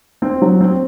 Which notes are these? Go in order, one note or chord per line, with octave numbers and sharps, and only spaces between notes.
C4
F#3
C4